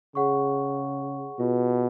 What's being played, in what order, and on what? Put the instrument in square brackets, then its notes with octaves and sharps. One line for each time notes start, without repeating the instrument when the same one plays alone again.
[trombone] C#3 [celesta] G#4 C#5 F#5 C#6
[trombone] B2 [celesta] F4 G#4 B4 F#5